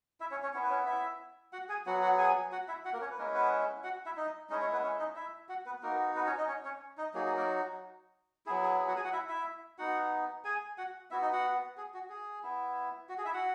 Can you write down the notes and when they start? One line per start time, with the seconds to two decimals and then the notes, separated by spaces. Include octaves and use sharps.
0.20 E4 E5
0.31 C#4 C#5
0.42 C#4 C#5
0.53 B3 C#4 E4 C#5
0.63 B4
0.70 C#4 C#5
0.86 E4 E5
1.53 F#4 F#5
1.69 G#4 G#5
1.86 F#3 B3 F#4 F#5
2.02 F#4 F#5
2.18 G#4 G#5
2.52 F#4 F#5
2.68 E4 E5
2.85 F#4 F#5
2.93 A#3 A#4
3.01 C#4 C#5
3.11 B4
3.18 G#3 A#3 C#4 E4 A#4
3.34 B3 B4
3.83 F#4 F#5
4.06 E4 E5
4.17 D#4 D#5
4.49 G#3 C#4 D#4 E4 D#5
4.60 C#4 C#5
4.73 B3 B4
4.83 C#4 C#5
4.99 D#4 D#5
5.16 E4 E5
5.49 F#4 F#5
5.66 B3 B4
5.82 A#3 B3 D#4 F#4 A#4
6.15 B3 B4
6.26 C#4 C#5
6.38 D#4 D#5
6.48 C#4 C#5
6.65 C#4 C#5
6.97 D#4 D#5
7.14 F#3 A#3 D#4 F#4 G#4
7.26 G#4
7.37 A#3 A#4
8.46 F#3 B3 E4 G#4
8.63 G#4
8.79 G#4
8.88 F#4 F#5
8.96 G#4 G#5
9.04 F#4 F#5
9.13 E4 E5
9.29 E4 E5
9.78 B3 D#4 F#4 F#5
10.44 G#4 G#5
10.78 F#4 F#5
11.11 B3 E4 F#4 E5
11.22 D#4 D#5
11.33 F#4 F#5
11.77 G#4
11.94 F#4
12.10 G#4
12.43 B3 E4
13.09 F#4
13.18 G#4
13.25 E4 E5
13.34 F#4 F#5